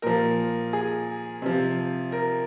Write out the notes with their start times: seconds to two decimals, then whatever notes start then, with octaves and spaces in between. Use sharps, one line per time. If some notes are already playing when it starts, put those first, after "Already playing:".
0.02 A#2 F3 A#4
0.73 G#4
1.42 C3 F3
2.12 A#4